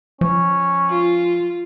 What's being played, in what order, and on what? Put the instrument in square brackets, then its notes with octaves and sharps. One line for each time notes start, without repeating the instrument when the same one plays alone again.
[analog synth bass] F3 [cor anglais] C#4
[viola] F4